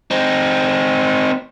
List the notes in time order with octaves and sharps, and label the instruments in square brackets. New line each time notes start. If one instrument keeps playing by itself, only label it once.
[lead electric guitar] C4 D#4